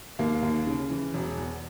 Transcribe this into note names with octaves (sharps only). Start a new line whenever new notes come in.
D#2 A#3
D#2
C#3
E3
E1
E2